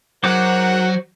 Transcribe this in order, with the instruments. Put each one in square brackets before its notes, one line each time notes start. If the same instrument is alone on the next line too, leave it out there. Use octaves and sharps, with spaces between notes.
[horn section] G#2 A#4 F#5 [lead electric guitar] F#3 [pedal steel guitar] F#4 C5 D6